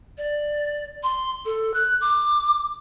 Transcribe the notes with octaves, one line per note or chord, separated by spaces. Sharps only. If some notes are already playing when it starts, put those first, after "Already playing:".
D5
C6
A4
F#6
D6